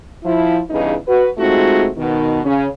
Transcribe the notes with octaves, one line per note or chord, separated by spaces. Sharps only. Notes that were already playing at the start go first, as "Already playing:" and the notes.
F3 E4
E2 G2 C#3 D#4
F#4 B4
G#3 A3 C4 D#4 F4 F#4
B2 D#3
C#3 C#4